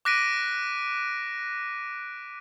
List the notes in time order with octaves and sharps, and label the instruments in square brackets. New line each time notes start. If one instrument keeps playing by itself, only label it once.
[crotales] D6 F#6 A#6 B6 D7 D#7